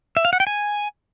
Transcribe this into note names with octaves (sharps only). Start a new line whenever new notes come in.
E5
F5
F#5
G5
G#5